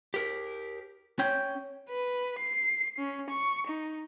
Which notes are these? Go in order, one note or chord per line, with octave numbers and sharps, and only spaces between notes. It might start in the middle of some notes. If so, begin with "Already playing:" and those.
G4 A#4
C#4 G5
B4
C7
C#4
C#6
D#4